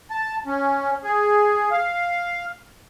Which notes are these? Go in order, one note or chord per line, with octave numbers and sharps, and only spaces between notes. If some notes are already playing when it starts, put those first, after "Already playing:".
A5
C#4
G#4
F5